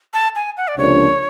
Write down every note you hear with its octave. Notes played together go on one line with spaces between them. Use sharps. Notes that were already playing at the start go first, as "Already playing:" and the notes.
A5
G#5
F#5
D5
C#2 C3 F3 A#3 D4 C#5